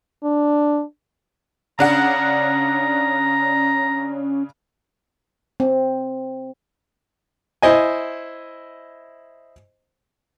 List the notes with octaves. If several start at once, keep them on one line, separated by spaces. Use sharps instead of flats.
D4
C#3 C#4 D4 F#5 A#5
C4
E4 C5 D#5 G#5